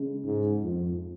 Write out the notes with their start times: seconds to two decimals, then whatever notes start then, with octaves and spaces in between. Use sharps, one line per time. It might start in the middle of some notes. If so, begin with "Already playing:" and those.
Already playing: C#3 G#3 C#4
0.25 G#2
0.63 F2